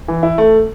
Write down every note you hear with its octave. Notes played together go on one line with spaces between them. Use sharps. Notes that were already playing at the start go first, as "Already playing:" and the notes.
E3
E4
A3